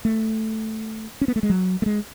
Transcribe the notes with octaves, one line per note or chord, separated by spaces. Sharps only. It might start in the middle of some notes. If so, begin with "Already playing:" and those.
A3
C#4
B3
A3
G#3
F#3
A3
G#3